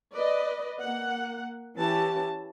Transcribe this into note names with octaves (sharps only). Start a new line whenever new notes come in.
B4 D5 D#5
A#3 F#5
E3 C#4 G4 A5